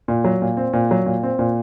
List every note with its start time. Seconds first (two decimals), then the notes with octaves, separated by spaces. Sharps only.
0.08 A#2
0.24 F#3
0.42 A#2
0.57 C4
0.73 A#2
0.91 F#3
1.06 A#2
1.23 C4
1.39 A#2